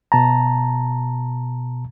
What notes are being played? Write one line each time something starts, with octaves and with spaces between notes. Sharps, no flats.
B2 A5 A#5